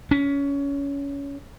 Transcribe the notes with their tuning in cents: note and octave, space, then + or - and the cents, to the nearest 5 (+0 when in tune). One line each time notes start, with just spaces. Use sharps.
C#4 +20